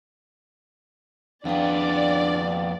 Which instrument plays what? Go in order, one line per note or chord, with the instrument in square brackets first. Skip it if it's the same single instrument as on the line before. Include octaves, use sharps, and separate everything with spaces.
[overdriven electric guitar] F2 B3 [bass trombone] D4 [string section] D5 [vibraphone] F5 G5